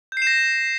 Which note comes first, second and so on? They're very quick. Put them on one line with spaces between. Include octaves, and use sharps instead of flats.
G6 C7 E7 A#6